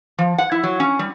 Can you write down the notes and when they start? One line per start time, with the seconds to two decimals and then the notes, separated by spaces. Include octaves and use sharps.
0.18 F3
0.38 F#5
0.52 E4
0.64 F#3
0.80 C#4
0.99 G3